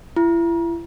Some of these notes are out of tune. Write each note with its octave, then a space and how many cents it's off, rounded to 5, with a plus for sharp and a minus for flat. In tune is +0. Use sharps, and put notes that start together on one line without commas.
E4 +35